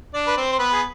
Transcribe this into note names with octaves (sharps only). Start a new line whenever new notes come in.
D4 D5
B4
C4 C5
C5
B3 B4
G#4